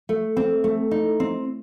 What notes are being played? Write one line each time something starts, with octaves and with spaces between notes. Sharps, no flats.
A3
C4
A3
D#4
C4